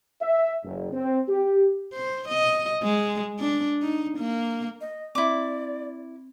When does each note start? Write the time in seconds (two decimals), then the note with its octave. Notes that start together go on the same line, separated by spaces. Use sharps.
0.21 E5
0.63 F#1
0.92 C4
1.28 G4
1.94 C5
2.29 D#5
2.83 G#3
3.39 D4
3.82 D#4
4.18 A#3
4.81 D#5
5.15 C4 E4 D5 D6